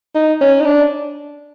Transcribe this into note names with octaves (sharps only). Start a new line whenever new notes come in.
D#4
C#4
D#4
D4